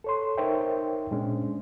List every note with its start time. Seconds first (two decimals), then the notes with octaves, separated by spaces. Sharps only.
0.04 A4 C#5 C6
0.38 D#4 A#4 C5 C#5 E5 G5
1.11 A#2 G#3 C#4 D4